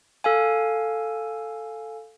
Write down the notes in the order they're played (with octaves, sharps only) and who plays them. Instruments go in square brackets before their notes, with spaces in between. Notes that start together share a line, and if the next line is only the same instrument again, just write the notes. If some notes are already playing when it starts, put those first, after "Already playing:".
[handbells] A4 F5 G#5